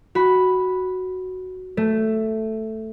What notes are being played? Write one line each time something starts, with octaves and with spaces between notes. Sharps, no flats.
F#4 B5
A3